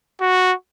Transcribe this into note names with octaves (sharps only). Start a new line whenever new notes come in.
F#4